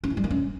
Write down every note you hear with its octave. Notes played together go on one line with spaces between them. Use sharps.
C#4
E4
G3
A#3
C#4